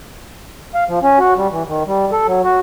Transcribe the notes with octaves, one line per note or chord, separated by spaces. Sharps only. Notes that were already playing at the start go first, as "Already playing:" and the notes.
F5
F3
C#4
F#4
G3
E3
D#3
G3
A4
F#3
F#4